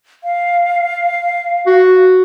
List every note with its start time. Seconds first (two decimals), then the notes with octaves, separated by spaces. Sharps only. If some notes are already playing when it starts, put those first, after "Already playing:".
0.24 F5
1.66 F#4